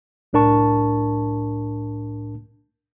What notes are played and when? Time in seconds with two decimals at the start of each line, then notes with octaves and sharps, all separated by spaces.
0.33 C2 A2 D4 A#4 A5 C#6